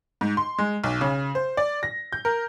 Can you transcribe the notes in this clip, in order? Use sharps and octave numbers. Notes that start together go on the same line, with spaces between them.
G#2
C6
G#3
B1
C#3
C5
D5
A#6
G6
A#4